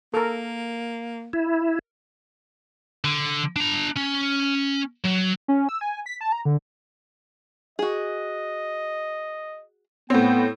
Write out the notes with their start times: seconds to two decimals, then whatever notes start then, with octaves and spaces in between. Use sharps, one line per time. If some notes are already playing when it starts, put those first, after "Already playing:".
0.14 A#3 A4 A#4
1.33 E4
3.04 D3
3.56 D4 A#5
3.97 C#4
5.05 F#3
5.48 C#4
5.69 E6
5.81 G#5
6.06 B6
6.21 A5
6.32 A#5
6.45 D3
7.79 F#4 G#4 D#5
10.10 A2 B3 C4 C#5 G5